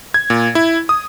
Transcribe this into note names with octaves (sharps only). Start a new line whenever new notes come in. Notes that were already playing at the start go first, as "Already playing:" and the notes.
G#6
A#2
E4
D#6